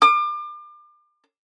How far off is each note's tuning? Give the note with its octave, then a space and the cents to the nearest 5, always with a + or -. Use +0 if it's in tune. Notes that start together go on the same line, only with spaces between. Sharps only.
D6 +35